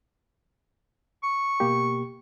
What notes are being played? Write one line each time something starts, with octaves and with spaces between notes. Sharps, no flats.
C#6
B2 A#3 G4